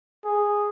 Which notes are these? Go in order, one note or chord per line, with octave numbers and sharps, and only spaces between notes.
G#4